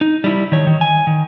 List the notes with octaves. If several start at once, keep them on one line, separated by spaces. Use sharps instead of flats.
D#4
G3 E4
D#3 C#5
D#3
G#5
D#3